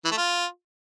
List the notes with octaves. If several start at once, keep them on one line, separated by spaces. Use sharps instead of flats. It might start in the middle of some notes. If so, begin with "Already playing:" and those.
E3
A3
F4